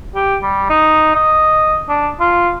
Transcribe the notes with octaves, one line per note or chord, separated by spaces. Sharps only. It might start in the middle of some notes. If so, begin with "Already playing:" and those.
G4
G3
D#4
D#5
D4
F4